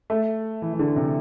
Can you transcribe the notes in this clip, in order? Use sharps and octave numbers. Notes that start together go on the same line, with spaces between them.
A3
E3
E3
D3
C3